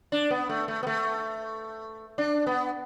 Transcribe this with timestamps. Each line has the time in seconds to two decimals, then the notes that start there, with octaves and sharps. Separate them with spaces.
0.12 D4
0.31 B3
0.49 A3
0.68 A3
0.83 B3
0.87 A3
2.18 D4
2.47 B3